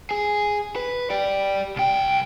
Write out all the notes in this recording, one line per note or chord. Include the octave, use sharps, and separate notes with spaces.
G#4
B4
G4 D5
C2 G5